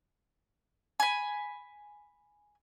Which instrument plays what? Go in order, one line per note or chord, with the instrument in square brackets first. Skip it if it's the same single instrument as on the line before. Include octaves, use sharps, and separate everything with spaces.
[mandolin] G#5 B5